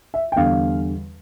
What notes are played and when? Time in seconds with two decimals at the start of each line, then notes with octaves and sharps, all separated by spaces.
0.14 E5
0.32 G5
0.36 E2 D3 G3 D4 F5